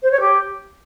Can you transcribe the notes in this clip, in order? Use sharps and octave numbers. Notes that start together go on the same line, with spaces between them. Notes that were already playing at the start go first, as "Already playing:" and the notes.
C5
C#5
G4